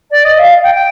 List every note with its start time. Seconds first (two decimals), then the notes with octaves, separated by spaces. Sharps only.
0.11 D5
0.24 D#5
0.38 F5
0.63 G5
0.74 G5